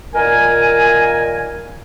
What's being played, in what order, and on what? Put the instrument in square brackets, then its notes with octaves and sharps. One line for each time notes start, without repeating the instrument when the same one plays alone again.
[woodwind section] A#2 D#3 A#4 G#5